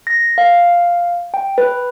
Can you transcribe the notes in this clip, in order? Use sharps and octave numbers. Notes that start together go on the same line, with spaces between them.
A#6
F5
G5
B4